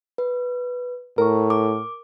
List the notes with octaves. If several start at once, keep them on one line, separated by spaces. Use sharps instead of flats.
B4
A2 A#4 A#5 C#6
D6